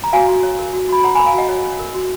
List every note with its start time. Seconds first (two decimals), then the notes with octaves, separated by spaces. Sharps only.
0.04 A#5
0.13 F#4 F5 G#5
0.28 F#4
0.43 C#5
0.59 A#4
0.73 F#4
0.89 F#4 B5
1.04 C#5 F#5 A#5
1.15 A#4 G#5 B5
1.26 F5 G#5
1.33 F#4 D#5 F#5
1.49 F#4 C#5
1.65 C#5
1.79 A#4
1.95 F#4